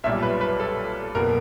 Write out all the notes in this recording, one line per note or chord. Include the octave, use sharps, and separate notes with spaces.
B1 A#2 G3 E5
B4
B4
A4
F#1 B2 A#4